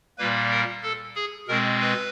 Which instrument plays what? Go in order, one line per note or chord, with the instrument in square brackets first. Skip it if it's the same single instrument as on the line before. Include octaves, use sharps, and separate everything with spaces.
[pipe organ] A#2 G3 A#3 B4
A#4
A4
G#4
B2 G#3 C4 A#4
B4